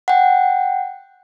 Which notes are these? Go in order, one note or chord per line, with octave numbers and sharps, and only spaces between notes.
F#5 G5